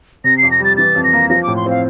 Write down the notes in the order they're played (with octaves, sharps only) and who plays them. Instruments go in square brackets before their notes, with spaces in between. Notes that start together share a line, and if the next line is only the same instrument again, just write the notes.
[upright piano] C3 [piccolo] A#6
[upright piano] F2 [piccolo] C7
[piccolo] A#6
[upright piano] G3 [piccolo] A6
[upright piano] E3 [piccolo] A6
[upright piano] F2
[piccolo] A#6
[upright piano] A#3
[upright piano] F3 [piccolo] A#6
[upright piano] A2 [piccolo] D6
[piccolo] C6
[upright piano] C4 [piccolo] F5